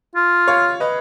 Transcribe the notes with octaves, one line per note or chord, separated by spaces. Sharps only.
F4
C#5 F5
B4 D#5